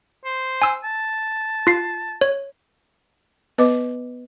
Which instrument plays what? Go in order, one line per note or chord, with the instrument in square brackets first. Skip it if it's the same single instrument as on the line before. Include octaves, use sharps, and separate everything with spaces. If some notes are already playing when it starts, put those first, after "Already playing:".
[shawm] C5
[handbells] G#5 E6
[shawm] A5
[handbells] F4 C7
C#5
[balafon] B3 B4 D#5 D6